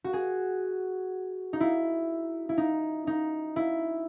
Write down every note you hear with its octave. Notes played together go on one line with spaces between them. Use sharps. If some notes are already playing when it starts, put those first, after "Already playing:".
F#4
G#4
D#4
E4
E4
D#4
D#4
E4